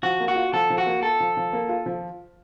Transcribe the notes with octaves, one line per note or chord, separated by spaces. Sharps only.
F3 F#4
A#3
F#4
F4
F3 A4
F3
F#4
A#3
F4 A4
F3
F3
A#3
F4
F3